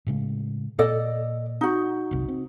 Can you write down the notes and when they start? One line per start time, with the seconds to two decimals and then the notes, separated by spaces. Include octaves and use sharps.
0.07 A2 C#3 G#3
0.79 A#2 A4 D5 D#5
1.61 D#4 F#4
2.11 F#1 C2 C3
2.28 C4